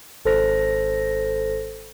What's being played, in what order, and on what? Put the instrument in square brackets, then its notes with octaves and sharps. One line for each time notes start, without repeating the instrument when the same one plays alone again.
[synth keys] G#1 A4 C5 A#6